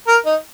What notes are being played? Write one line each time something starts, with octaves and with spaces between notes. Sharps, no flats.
A#4
D#4